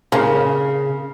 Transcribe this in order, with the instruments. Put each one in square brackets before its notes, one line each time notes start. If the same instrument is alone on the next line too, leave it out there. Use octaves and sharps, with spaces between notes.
[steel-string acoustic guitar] C#3 [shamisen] A#3 C#4